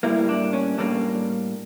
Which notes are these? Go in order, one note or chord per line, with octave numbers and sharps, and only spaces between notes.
A2 G3 A#3 E4
D4
C#4
A2 G3 A#3 D4